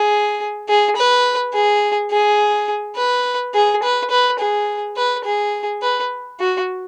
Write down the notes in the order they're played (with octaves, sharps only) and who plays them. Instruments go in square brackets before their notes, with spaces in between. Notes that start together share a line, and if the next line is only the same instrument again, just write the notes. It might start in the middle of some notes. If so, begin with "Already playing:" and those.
Already playing: [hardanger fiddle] G#4
G#4
B4
G#4
G#4
B4
G#4
B4
B4
G#4
B4
G#4
B4
F#4